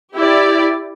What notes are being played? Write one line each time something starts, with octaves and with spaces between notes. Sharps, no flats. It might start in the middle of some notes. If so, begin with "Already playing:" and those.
E4 G4 D5